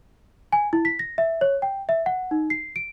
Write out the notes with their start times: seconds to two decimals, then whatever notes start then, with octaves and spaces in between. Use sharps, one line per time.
0.53 G#5
0.73 E4
0.85 B6
0.99 A#6
1.18 E5
1.41 C#5
1.62 G5
1.89 E5
2.06 F#5
2.31 D#4
2.50 C7
2.76 D7